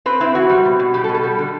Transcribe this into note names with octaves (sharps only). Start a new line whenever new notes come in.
C4 B4
C4 E4
E3 F#4
G3
B2
B2
G3 G4
A4
B2
A4
G3
D3